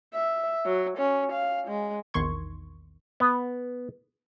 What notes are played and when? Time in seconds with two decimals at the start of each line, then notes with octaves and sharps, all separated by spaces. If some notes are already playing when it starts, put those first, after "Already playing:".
0.14 E5
0.65 F#3
0.98 C#4
1.33 F5
1.68 G#3
2.14 A#1 E2 D#3 C6 C#6 G#6
3.20 B3